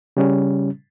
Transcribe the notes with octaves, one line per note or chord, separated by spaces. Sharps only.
C#3 G3 C#4